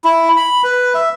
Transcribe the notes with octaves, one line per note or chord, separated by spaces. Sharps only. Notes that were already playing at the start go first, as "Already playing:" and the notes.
E4
B5
B4
E5